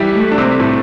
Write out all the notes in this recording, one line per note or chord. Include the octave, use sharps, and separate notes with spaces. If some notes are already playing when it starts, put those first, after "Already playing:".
Already playing: E3 G3 E4 G4
A3
D4
C3 C4
A2 A3